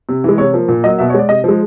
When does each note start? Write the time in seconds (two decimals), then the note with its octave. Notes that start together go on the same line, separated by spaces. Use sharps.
0.09 C3
0.24 E3 G#3
0.38 C3 C#5
0.54 F3 A#3
0.68 A#2
0.84 F#3 A#3 D#5
0.98 B2 E5
1.10 C#5
1.14 G#3 D5
1.29 C3 D#5
1.44 F3 G#3